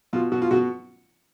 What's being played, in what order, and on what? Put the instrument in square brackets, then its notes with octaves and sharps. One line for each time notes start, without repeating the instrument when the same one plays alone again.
[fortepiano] B2 F4
B2 F#4
F4
B2 F#4